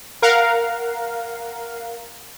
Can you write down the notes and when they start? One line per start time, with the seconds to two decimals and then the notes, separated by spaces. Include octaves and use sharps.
0.22 A#4 F5 F#5